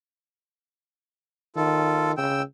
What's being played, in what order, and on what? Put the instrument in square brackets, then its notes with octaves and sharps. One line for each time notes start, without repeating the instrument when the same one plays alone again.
[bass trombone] D#3 [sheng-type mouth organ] F4 A4
[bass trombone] C#3 [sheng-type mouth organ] G5 E6